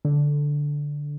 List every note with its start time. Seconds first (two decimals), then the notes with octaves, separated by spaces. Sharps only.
0.05 D3